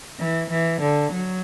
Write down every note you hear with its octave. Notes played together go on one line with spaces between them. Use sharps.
E3
E3
D3
F#3